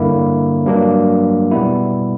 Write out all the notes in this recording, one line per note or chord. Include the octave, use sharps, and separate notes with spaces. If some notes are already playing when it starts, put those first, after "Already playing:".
Already playing: G2 D3 A#3 E4
G2 F#3 A#3 D4
B2 G3 B3 E4